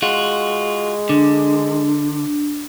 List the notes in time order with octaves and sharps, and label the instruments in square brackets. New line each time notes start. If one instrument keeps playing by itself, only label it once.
[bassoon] G#3 [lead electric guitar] F4 F#4
[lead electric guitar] D3 [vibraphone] D4